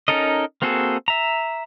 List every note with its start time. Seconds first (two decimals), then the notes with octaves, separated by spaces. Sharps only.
0.08 C#4 D#4 A4 A#4 D#5
0.62 A#3 C4 F#4 G#4 A4
1.08 E5 A#5